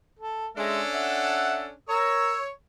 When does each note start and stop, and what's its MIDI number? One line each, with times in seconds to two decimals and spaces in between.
0.19 0.48 69
0.57 0.81 56
0.57 1.71 61
0.57 1.71 62
0.57 1.71 69
0.57 0.81 76
0.94 1.62 76
0.94 1.62 78
1.89 2.37 70
1.89 2.50 73
1.89 2.37 88